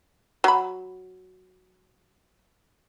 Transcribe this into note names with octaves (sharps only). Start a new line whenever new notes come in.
F#3 B5